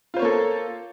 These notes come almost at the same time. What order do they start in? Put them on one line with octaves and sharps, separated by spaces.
F4 C5 C#5 A#3 A4